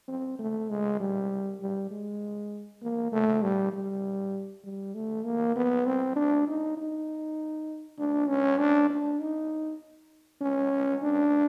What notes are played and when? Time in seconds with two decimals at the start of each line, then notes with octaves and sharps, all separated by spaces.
0.08 C4
0.39 A3
0.70 G#3
1.00 G3
1.61 G3
1.91 G#3
2.82 A#3
3.12 A3
3.42 G3
3.73 G3
4.64 G3
4.95 A3
5.25 A#3
5.56 B3
5.86 C4
6.16 D4
6.47 D#4
6.77 D#4
7.98 D4
8.28 C#4
8.59 D4
8.90 D4
9.21 D#4
10.41 C#4
11.02 D4